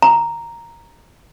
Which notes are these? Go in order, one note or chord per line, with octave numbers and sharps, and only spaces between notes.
A#5